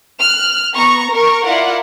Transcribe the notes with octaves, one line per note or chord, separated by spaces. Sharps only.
F6 F#6
B3 A#5 C#6
A#4 C#6
E4 F4 A#4 D5 F5 F#5